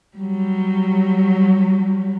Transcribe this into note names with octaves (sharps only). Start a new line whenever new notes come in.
F#3 G3